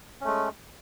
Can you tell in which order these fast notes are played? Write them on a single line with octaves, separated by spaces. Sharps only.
C#4 A3 G#3